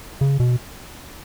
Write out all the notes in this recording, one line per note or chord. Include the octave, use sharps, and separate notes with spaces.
C#3
B2